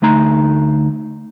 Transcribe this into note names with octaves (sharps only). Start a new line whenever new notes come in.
D2 A3 D#4 A#5